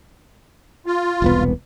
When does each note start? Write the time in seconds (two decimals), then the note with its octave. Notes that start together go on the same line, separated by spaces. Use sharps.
0.86 F4
1.22 E1 C2 B3